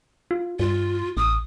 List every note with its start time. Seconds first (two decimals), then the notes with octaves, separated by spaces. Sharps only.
0.31 F4
0.60 G2 F4
1.17 A1 D#6